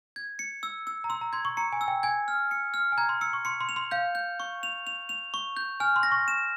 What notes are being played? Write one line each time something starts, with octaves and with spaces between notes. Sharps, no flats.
G#6
C#7
E6
E6
A#5
C6 E6
A#5
C6 G#6
C#6
A#5 C#7
G#5
E6
G5
G#5 G#6
F6
C#7
F6
G#5
A#5 G#6
C6
E6 C#7
C#6
C6 C#7
C6
F7
C6
F5 G6
G6
C#6
F7
F7
F7
C#6
G6
G#5 F6
C6
A#6
C#6
E7